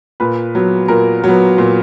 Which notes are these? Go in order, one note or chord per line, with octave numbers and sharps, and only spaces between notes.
A#2 B4
F#3 B3
A#2 A#4
F#3 B3
A#2